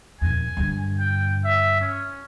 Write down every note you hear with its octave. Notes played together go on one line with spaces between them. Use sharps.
D#1 F2 G#5
G2 D3
G5
E5
C#4